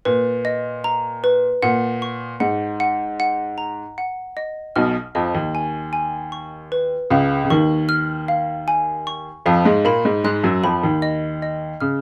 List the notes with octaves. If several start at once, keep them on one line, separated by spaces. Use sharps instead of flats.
A#2 B4
D#5
A#5
B4
A#2 F#5
C#6
G#2 F#5
F#5
F#5
A#5
F#5
D#5
B1 B2 F6
F2 F3 D#5
D#2 D#3
G#5
G#5
C#6
B4
C#2 C#3 F5
C#3
D#2 D#3 C#6
F6
F5
G#5
C#6
F2 F3 F5
G#2 G#3
A#2 A#3 B5
G#2 G#3
G#2 G#3 F#6
F#2 F#3
F2 F3 B5
D#2 D#3
D#5
D#5
C#3 F6